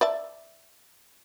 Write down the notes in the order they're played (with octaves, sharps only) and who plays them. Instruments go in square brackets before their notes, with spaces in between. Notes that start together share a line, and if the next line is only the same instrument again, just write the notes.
[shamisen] D5 E5 A5